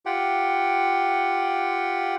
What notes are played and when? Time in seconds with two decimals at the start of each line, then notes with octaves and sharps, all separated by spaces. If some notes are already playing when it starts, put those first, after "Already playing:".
0.06 F4 G4 F#5 G5